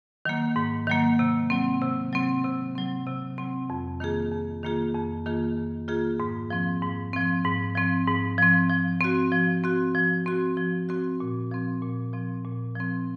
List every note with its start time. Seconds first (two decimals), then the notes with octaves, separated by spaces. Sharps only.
0.25 D#3 F#3 A#3
0.56 G#2
0.87 D#3 F#3 A#3
1.19 C3
1.50 F#3 C4
1.82 C3
2.13 F#3 C4
2.44 C3
2.75 F#3 C4
3.07 C3
3.38 F#3 C4
3.70 F2
4.00 D#3 A#3 F4 G#4
4.32 F2
4.63 D#3 A#3 F4 G#4
4.95 F2
5.26 D#3 A#3 F4 G#4
5.57 F2
5.88 D#3 A#3 F4 G#4
6.20 G#2
6.50 F3 C4
6.83 G#2
7.13 F3 C4
7.44 G#2
7.75 F3 C4
8.07 G#2
8.38 F3 C4
8.69 F3
9.01 C4 F#4
9.32 F3
9.64 C4 F#4
9.95 F3
10.26 C4 F#4
10.57 F3
10.89 C4 F#4
11.20 A#2
11.51 F3 C4
11.82 A#2
12.13 F3 C4
12.45 A#2
12.76 F3 C4